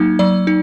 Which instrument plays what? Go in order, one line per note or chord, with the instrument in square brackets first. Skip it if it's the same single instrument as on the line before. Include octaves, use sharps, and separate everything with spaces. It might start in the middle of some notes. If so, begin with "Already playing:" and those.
Already playing: [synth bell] F#3 A#3 D#4
F#3 D5
D#4